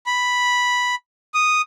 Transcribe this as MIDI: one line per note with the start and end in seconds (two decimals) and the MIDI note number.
0.06 0.95 83
1.34 1.62 87